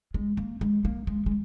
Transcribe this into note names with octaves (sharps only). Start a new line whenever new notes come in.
G#3
A#3
G#3
A#3
G#3
G#3